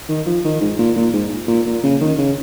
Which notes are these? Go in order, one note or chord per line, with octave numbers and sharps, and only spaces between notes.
D#3
F3
D#3
G#2
A#2
A#2
G#2
A#2
A#2
C#3
D#3
C#3